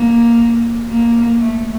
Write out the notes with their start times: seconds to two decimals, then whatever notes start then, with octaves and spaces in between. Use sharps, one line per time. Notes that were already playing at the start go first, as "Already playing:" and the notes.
Already playing: A#3
0.89 A#3
1.38 A3